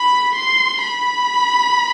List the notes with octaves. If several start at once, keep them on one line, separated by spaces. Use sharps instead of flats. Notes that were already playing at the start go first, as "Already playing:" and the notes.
Already playing: B5
C6
B5